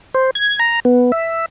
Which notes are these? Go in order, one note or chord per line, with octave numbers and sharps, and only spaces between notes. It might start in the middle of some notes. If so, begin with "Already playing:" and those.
C5
G#6
A#5
B3
E5